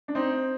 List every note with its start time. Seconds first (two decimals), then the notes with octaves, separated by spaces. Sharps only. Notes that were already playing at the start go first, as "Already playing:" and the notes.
0.08 D4
0.15 C4 D#4